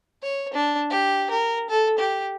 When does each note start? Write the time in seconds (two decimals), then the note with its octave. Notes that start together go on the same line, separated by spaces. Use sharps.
0.22 C#5
0.53 D4
0.90 G4
1.30 A#4
1.70 A4
1.98 G4